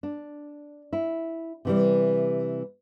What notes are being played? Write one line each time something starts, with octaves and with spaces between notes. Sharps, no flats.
D4
E4
C3 E3 G3